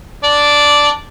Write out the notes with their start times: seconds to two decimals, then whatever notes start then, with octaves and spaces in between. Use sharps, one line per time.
0.24 D4 D5